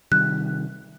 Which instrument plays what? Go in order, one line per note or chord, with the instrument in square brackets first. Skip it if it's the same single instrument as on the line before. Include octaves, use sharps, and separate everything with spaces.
[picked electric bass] C3 D#3 G3 [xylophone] F#6